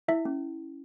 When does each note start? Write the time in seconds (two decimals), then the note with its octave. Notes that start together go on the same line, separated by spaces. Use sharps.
0.08 E4 E5
0.25 C#4